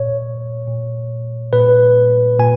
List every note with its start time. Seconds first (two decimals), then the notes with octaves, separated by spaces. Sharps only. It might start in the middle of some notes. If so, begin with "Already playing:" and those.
Already playing: A#2 C#5
0.67 A#2
1.53 A#2 B4
2.39 A#2 G#5